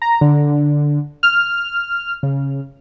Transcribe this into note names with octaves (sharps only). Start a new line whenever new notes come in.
A#5
D3
F6
C#3